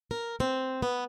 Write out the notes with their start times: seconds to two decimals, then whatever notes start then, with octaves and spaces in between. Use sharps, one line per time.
0.11 A#4
0.40 C4
0.82 B3